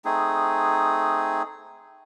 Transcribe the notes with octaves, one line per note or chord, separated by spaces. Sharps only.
A3 C4 D#4 G#4